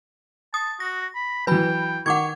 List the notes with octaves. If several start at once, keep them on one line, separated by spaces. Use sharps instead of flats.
A5 D#6
F#4 A#6
B5
E3 F#3 B4 G5 B5
D#3 F#5 C#6 D6 G#6